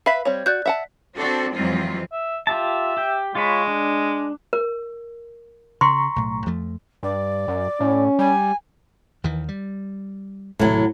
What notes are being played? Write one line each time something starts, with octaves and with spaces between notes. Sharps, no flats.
B4 E5 F5 B5 B6
G3 C4 C#5
F#4 D5 F#6 G6
E5 F#5 A5
C4 D4 F#4 A4
F2 E3 F#3 G#3 C4 F4
E5
F4 G4 E5 A5
G4 G5
G#3 F4 C#5 B5
D4
A#4
C#3 A#5 C6 C#6
B1 A2
F2 F3 A3
G2 D5
F#2
A2 C#4
G3 G#5
D#2 D#3 E3
G3
D#1 G#1 A2 C3 F#3